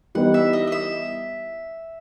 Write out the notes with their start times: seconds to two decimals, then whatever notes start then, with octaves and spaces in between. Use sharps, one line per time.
0.15 E3 G3 B3 D#4 F#5
0.34 E5
0.53 D#5
0.67 D#5
0.72 E5